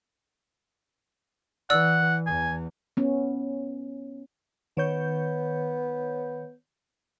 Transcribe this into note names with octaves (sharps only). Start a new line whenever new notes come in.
E3 D5 F#5 E6
E2 G#5
B3 C#4
D#3 B3 C#5 G6